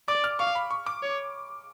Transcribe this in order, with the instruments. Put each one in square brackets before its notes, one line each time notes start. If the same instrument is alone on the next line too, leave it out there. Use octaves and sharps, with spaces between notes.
[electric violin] D5 [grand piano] D6
[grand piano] F6
[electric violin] F5 [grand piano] C#6
[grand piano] B5
C#6
D6
[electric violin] C#5